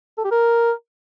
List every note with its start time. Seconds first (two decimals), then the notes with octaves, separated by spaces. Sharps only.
0.18 A4
0.24 G4
0.31 A#4